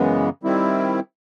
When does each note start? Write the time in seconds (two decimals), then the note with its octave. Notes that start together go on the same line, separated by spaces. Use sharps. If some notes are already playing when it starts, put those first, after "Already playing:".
Already playing: F#2 C#3 E3 G#3 B3
0.43 D#3 G3 C4 E4